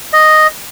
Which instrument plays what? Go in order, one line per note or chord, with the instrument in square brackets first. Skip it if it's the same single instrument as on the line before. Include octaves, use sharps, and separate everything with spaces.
[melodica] D#5